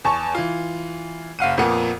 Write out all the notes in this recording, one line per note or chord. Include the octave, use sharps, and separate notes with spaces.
E2 A5 C#6
E3 F4
F#1 F5 F#5 D#7
F2 A#2 A#3 B3